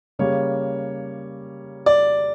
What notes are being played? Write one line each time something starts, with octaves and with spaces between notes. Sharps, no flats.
C#3 G3 A#3 C#5
D5